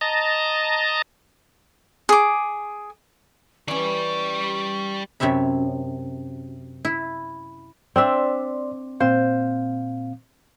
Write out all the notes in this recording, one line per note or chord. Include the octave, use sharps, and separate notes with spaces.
D#5 A5 A#5
G#4 D6
E3 G3 C#4 D5 C#6
F#2 C3 C#5 E5 B5
E4
C4 D4 D5 E5 C6
A#2 C4 C5 F5